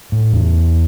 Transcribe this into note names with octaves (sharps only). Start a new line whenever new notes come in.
A2
E2